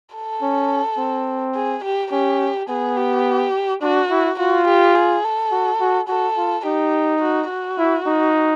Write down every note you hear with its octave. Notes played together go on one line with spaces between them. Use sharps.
A4
C#4
C4
G#4
G4
C#4 G4
B3 G#4
G4
D4 F#4
E4
F4 F#4
G4
G#4
A4
F#4
F#4
F#4 A4
F4
D#4 G4
F#4
F#4
E4
D#4